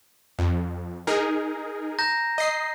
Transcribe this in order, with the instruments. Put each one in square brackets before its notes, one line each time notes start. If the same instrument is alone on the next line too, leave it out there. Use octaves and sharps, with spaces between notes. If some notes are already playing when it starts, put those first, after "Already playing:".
[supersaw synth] F2
D#4 G#4 A#4
[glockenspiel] A#5 G6 A#6
[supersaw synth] D#5 C7